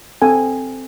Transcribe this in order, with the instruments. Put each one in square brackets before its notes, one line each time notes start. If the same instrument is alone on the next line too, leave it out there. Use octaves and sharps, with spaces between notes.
[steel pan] C4 A4 G#5